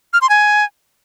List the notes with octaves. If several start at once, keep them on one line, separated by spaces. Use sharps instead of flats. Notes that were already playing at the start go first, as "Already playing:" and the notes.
F6
C6
G#5